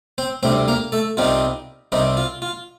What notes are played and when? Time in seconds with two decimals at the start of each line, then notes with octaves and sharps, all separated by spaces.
0.18 C4 C5
0.43 D2 C3 G3 C4 C5
0.68 A#3 A#4
0.92 A3 A4
1.17 C2 C3 G3 C4 D#4 F4
1.92 C2 C3 G3 C4 D#4
2.17 F4
2.42 F4